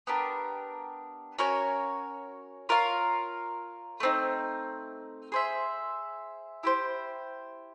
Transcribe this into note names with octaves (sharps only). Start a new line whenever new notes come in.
B3 D4 G4 A#4
C#4 F#4 A#4 C#5
F4 A#4 C#5 F5
A3 C4 D#4
G#4 C5 E5
E4 G4 C5